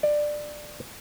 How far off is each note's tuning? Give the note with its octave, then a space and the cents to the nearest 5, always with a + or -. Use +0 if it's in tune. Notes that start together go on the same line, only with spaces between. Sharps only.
D5 +15